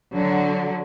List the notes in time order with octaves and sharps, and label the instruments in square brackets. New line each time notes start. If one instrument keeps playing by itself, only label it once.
[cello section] D3 F#3